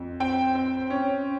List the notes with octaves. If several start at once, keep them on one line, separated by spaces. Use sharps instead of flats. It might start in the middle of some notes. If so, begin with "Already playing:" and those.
Already playing: F2
C4 G5
C4
C#4